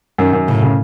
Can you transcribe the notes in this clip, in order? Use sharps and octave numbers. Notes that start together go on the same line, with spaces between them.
F#2 D#3
F#2
A2 C#3
C#3